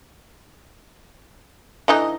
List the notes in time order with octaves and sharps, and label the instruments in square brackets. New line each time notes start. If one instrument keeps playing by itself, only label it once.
[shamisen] D3 E3 D#4 [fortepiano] D#5